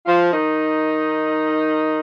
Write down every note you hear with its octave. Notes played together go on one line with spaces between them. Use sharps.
F3 F4
D#3 D#4